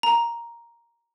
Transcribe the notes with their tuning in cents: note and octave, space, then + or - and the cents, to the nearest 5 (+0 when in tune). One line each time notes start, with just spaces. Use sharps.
A#5 +5